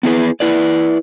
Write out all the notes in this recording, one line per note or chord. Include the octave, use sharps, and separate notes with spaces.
B3 E4 G#4 B4
E4 B4 D5